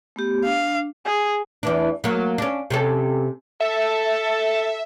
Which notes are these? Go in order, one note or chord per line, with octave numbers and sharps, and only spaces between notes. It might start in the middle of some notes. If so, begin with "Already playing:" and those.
A3 B3 G4
D4 F5
G#4
E2 E3 D4
F#3 A#3
C#4 D4
C3 C#4 A4
A4 E5